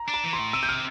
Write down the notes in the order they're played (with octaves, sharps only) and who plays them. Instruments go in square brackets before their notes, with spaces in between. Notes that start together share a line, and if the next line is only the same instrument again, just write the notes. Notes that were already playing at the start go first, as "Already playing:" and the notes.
Already playing: [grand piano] A#5
[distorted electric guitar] D4
[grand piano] A#5
[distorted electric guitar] E3
[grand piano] C6
[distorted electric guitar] A2
[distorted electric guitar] C3 [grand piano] E6
[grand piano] G6
F6